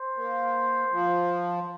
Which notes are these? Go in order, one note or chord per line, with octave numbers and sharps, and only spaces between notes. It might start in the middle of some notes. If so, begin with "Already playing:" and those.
Already playing: C5
A#3
F3